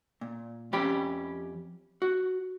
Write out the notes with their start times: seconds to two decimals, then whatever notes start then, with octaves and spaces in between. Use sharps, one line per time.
0.21 A#2
0.73 F2 C#4 G4 B5
2.02 F#4